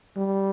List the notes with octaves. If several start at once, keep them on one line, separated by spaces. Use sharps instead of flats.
G3